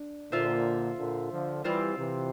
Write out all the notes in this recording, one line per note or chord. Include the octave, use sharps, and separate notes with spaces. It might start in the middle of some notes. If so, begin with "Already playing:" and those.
Already playing: D4
A#2 D3 F4 C5 E5
A#2 D3
D3 F3
E3 G3 C4 F4 C5
C3 E3